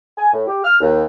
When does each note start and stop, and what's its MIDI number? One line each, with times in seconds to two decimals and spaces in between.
0.17 0.29 80
0.33 0.45 45
0.48 0.64 67
0.64 0.76 89
0.81 1.04 39